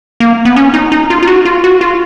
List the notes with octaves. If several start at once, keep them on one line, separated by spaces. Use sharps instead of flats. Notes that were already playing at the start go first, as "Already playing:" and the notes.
A#3
B3
C#4
D#4
D#4
F4
F4
F#4
F4
F#4
F4